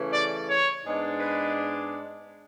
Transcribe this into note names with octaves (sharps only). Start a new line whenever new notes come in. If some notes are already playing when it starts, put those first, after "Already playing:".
Already playing: C#3 E3 A3 C#4
D5
C#5
G#2 G#3 B3 D4
B4